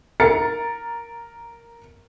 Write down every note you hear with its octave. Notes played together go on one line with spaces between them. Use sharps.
A#4 A#5 A6 C#7